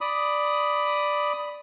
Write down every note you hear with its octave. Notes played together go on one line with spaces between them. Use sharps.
D5 B5 D#6